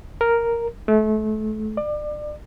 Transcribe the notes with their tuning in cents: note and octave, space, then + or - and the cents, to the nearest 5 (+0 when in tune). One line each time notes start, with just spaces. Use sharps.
A#4 +0
A3 -30
D5 +30